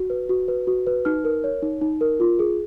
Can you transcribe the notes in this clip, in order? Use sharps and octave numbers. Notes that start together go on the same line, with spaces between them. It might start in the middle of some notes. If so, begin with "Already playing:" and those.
Already playing: F#4
B4
F#4
B4
F#4
B4
D#4 F6
A#4
C#5
D#4
D#4
A#4
F4
G#4